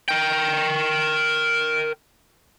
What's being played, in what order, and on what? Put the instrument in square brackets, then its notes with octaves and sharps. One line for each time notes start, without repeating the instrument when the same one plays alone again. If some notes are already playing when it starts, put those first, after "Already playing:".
[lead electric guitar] A#4 G5